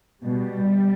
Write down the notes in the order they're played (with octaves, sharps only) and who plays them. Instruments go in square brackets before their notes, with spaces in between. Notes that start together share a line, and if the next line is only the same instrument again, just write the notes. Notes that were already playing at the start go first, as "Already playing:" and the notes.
[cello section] B2 G3